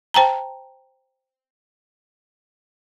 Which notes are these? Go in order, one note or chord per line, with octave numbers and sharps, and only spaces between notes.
C5 G5 A5 A#5